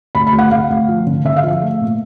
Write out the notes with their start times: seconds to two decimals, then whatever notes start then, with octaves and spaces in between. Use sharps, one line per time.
0.15 D2 B5
0.27 B5
0.33 D2
0.39 F#5
0.51 D2 F5
0.70 D2
0.88 F3
1.07 D3
1.24 D3 E5
1.36 F5
1.43 F3
1.48 E5
1.61 A3
1.80 A#2